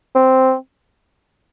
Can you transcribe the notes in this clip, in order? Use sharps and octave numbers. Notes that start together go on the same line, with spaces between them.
C4